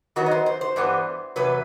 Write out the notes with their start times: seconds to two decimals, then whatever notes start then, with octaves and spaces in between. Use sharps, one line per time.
0.16 D#3 F#3 B3 D#4 F#4
0.26 D#5
0.31 C5
0.46 C5
0.61 C5
0.76 G2 E3 G3 B3
1.36 E2 C3 F#3 B4